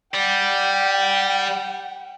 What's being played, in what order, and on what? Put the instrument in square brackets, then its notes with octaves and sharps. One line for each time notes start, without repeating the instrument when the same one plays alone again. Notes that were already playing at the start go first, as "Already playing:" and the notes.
[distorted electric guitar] G3 [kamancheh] F#5 G5